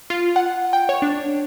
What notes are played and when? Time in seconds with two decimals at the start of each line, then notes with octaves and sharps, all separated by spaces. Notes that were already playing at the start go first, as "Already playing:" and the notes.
0.10 F4
0.36 F#5
0.73 G5
0.89 C#5
1.02 D4